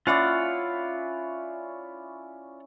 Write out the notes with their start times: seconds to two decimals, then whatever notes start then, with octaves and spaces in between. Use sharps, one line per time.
0.07 C#4 E4 F4 D5 F5 F#5